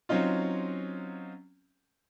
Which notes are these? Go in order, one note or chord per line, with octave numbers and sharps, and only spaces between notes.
F#3 C4 C#4 D#4 F4